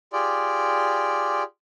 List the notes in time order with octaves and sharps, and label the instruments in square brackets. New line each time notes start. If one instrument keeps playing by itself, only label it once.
[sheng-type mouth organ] F4 G4 G#4 D5